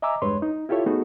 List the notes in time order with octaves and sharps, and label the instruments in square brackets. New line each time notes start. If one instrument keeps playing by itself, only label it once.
[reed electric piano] D#5 E5 G#5 A#5 D6 E6
E2 G2 G#3 B4 C#5 C6
D#4
E4 F4 G4 A4 C#5 E5
A3 B3 D#4 F#4 G#4 A4